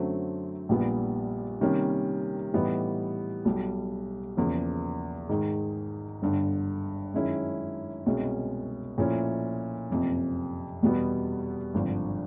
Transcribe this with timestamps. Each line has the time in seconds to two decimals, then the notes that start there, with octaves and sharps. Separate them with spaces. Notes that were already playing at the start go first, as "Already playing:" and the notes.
Already playing: F#2 D3 F#3 A3 C4
0.69 A#1 A#2 G3 B3
1.61 C3 D#3 G3 A#3 C#4
2.53 A2 E3 G3 B3 D#4
3.45 B1 B2 G3
4.37 E2 C#3 F3 A#3
5.29 G#2 D#3 G#3
6.22 G1 G2 D3
7.14 F#2 D#3 G#3 C#4 E4
8.06 C2 B2 G#3 C#4
8.98 A#2 F3 A3 C#4 E4
9.89 F#1 F2 C3 F3
10.82 E2 B2 G3 B3
11.74 G#1 G2 D3 F3